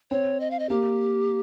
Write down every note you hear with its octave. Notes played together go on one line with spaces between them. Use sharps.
C4 C#5
D#5
F5
D#5
A#3 G4